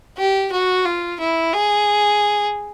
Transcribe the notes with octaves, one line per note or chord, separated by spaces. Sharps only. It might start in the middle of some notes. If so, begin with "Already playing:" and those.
G4
F#4
F4
E4
G#4